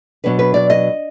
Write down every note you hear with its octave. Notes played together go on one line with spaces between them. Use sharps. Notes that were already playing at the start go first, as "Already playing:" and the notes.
B2 F#3 B3 D4 B4
B4
D5
D#5